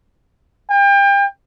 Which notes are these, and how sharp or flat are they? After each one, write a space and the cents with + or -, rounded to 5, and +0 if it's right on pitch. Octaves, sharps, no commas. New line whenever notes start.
G5 +35